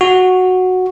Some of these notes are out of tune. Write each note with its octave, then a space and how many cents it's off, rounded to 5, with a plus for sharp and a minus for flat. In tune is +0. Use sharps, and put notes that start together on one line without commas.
F#4 -5